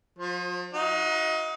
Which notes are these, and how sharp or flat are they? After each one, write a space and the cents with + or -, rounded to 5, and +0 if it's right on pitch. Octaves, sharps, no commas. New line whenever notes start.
F3 +40 C5 +15
D#4 +30 F#4 +0 F5 +45